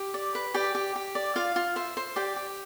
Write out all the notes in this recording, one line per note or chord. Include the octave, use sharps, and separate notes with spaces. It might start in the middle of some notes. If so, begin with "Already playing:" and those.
Already playing: G4 G5
D5
B4
G4 D5 G5
G4
G4
D5
F4 F5
F4
C5 E5
C5
G4 D5 G5
G4